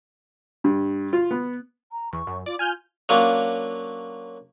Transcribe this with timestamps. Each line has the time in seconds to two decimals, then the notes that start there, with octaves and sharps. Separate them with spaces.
0.64 G2
1.13 F4
1.31 B3
1.92 A#5
2.13 E2 C#6
2.27 F#2
2.46 F4 D5
2.59 F4 G#5 F6 G6
3.09 F#3 A#3 C#4 D4 F4